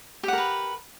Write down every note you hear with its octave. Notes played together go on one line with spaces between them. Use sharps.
G4 A#4 B4 F#5